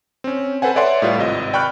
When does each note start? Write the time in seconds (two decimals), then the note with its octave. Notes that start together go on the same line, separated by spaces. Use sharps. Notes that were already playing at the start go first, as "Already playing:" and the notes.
0.24 C4 C#4
0.62 A4 B4 C5 F#5 G#5
0.75 B4 C#5 D5 E5 F#5 C6
1.02 A2 G3 F4 B4
1.18 G#1 C3 D#5
1.53 D5 G5 B5 C#6 F6 F#6